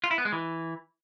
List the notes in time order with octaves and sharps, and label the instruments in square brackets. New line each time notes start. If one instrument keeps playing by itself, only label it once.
[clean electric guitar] F4
E4
B3
G#3
E3